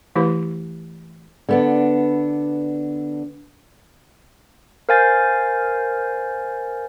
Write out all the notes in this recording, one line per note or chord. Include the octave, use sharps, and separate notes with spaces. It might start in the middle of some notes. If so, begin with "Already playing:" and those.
E3 A3 E4 G4 B4 B5
D3 B3 D4
A#4 C5 F5 G#5 G6 A6